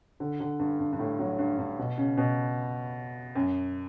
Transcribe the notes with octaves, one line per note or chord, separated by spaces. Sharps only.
D3
D3
G2
G2
G2
A2
F#3
G2
G2
B2
C#3
B2
F#2